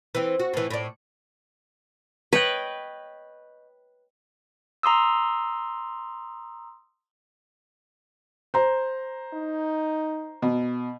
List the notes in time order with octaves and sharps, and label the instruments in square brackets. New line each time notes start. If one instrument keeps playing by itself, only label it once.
[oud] E3 C4
F#4
A2 E3
A2 D5
[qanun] B4 [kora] C#5 D#5 G5
[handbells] A#5 C6 D#6 E6
[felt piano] C5 A#5
[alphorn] D#4
[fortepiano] B2